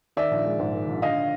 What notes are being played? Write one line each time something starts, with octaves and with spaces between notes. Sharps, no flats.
D#3 D5 E5
A#1
G#3
G#2
D#3
A#1
D3 D#5 F5